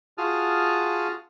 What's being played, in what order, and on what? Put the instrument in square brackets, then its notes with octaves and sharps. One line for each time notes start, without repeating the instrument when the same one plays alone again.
[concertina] F4 F#4 G#4 A5 D#6 F6